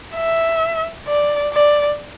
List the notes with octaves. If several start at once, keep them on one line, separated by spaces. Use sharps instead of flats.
E5
D5
D5